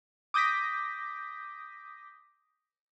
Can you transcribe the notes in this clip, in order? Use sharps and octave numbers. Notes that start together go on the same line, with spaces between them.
D6 D#6 G6 A#6 B6